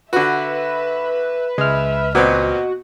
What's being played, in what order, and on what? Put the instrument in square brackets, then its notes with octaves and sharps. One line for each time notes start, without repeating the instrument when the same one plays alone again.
[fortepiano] D3 F#4 [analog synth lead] B4 [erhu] E5
[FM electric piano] C#2 F6 [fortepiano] G#3 [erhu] E5
[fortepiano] A#2 B3 C4 [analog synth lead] F#4 [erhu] D#5